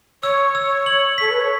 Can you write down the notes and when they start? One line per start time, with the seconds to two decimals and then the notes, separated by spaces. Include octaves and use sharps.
0.22 C#5 E6
0.55 E6
0.86 F#7
1.18 A4 B6
1.30 B4
1.40 C#5